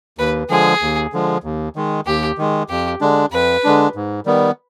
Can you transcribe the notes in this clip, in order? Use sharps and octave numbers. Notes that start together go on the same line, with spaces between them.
D#2 B4
D3 F3 G#3 G#4
D#2
D3 F3 G#3
D#2
D#3 G#3
D#2 G4
D#3 G#3
F2 G4
D3 G#3 D4
F2 B4
D3 G#3 D4
G#2
D#3 G3 B3